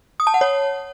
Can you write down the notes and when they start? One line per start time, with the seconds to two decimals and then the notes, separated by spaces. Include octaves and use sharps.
0.20 D#6
0.27 A5
0.34 F#5
0.41 C#5